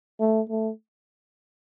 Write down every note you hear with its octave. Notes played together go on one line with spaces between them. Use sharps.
A3
A3